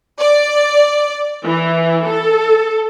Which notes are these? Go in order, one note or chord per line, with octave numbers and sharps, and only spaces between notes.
D5
E3
A4